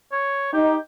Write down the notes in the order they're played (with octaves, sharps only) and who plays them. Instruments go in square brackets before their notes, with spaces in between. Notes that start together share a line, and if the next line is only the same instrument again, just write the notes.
[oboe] C#5
[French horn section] D#4 [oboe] G4